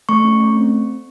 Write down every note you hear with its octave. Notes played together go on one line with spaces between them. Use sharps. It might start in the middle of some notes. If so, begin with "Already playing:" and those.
A3 C#6
C#4
A3
C4